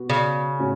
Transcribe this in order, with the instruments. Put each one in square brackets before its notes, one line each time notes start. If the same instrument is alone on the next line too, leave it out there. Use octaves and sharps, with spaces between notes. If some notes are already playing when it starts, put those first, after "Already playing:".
Already playing: [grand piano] B2 B3 F#4
[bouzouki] C#3
[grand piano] A2 C#4 F#4